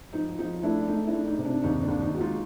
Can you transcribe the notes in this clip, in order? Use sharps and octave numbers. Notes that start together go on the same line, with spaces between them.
F3 D#4
F3 D#4
A3 D4 E4
A3 D#4
D4 E4
A3
D#4
C3
D4
D#2 D#4
D4
D#2
D#4
G#3 F#4
D#4 F4